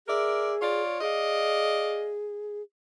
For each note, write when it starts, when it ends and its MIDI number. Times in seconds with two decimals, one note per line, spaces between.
0.07 0.82 68
0.07 0.54 70
0.07 0.54 74
0.07 0.54 76
0.60 0.97 65
0.60 0.97 73
0.60 0.97 74
1.01 2.62 68
1.01 2.13 74
1.01 2.13 75
1.01 2.13 77